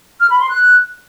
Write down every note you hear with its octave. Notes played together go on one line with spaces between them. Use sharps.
F6
B5
C6
F#6